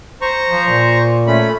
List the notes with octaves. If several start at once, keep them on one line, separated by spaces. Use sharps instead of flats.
C5 A#5 C#6
F3
A#2
A3 C#4 B5